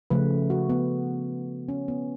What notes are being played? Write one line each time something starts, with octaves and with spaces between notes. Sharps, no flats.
C#3 F3 A3 B4
F#4
B3
C#4
B3